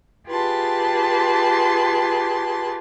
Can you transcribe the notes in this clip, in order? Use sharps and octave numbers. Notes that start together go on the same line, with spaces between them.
F4 G4 G#4 B4 A5 C6